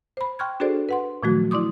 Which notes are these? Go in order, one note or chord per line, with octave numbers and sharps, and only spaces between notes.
C5 B5
G5 C6 C#6 F6 F#6 G#6
D4 F#4 G#4 A4 C5 D5
B4 F#5 C6
A#2 D#3 F3 F#3 A3 F#4
E4 D5 C6 D6 D#6